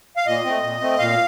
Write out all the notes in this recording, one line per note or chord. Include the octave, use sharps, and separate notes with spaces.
F5
A#2 D#5
A3 C4
A#2
A3 C4
A#2 F5